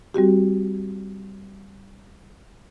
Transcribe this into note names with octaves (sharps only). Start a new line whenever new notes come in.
G3 C4 F#4 G4